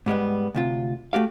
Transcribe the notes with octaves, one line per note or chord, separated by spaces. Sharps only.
G#2 G3 G#3 B3
D2 C3 F4
A3 F#4 G4 F5